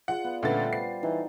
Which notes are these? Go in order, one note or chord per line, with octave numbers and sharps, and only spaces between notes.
F4 G#4 D5 F#5
B3
A#2 D3 G3 A3 C#4 B4 A6
C5 C7
E3 D#4 A4